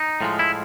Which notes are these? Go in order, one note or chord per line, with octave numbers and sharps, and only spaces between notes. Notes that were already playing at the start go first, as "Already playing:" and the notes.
Already playing: D#4
A2 F3 G#3
E4